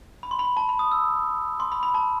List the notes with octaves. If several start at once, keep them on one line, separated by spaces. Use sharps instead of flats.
B5
C6
B5
A5
B5
D#6
E6
C6
B5
B5
A5